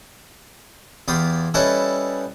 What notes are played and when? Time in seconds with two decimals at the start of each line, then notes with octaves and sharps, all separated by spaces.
1.08 E2 F4 G4 B5 D#6
1.54 G3 C#4 E4 A4 B4 D#5